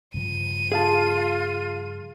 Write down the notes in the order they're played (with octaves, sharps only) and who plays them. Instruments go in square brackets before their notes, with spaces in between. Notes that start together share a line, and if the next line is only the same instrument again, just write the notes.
[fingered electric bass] G2 C#3 F3 [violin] D#7
[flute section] F4 [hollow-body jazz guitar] G#4 F5 A5